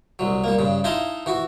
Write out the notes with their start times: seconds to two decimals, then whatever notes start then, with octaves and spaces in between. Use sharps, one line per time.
0.19 C2 F#3
0.44 G3 A#3
0.59 G2 C#3
0.84 D#4 E4 D#5 F5 A5 C6
1.26 E3 F#4